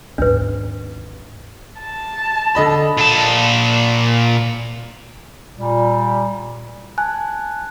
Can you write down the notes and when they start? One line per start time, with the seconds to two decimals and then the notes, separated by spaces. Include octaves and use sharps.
0.18 G#1 D#2 D4 B4
1.79 A5
2.55 D3 D#5 B5
2.98 A#2 A5
5.58 A#2 G3
6.98 G#5 A5 F#6